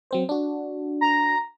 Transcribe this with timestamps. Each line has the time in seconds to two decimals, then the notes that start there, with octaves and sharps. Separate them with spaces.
0.11 F#3 C4 C5
0.29 D4 F#4
1.01 A#5